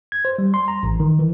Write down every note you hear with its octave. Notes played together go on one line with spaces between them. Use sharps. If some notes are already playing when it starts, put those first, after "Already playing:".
G#6
C5
G3
C6
A#5
A1
D#3
E3